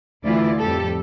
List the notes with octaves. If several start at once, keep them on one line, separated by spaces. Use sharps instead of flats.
D2 E3 E4 F4 D5
F2 A2 G3 G4 A4